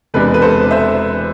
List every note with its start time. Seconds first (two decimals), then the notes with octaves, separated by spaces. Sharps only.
0.14 E1 E2 C3 G#3 D4 B4
0.34 B4
0.42 A4 C5
0.71 C5 E5